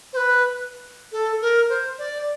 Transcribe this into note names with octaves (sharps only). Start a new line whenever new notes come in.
C5
B4
A4
A#4
C5
D5